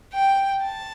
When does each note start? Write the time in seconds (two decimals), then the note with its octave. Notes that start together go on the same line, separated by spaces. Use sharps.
0.13 G5
0.63 A5